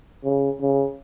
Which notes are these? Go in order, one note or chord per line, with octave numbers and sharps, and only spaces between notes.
C#3
C#3